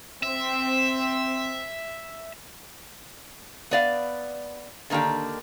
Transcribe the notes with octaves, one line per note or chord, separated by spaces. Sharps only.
C4 E5
B3 D5 F5
D3 D#3 A#3 D4 G4